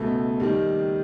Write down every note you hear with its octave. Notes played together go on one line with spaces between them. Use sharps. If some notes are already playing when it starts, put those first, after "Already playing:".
Already playing: C#2 B2 A3
D#2 D#3 G3